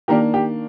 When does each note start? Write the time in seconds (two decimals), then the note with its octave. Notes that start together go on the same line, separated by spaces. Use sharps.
0.08 D#3 A#3 D4 G4 A#4
0.34 G4